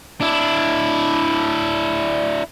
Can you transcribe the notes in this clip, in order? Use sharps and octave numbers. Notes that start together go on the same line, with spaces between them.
D4 E4